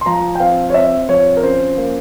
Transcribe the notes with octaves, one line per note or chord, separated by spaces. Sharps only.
C6
F3 A#5
G5
C4 F5
C#5
C4 E5
F3 C#5
A#4
C#4 C5
A#3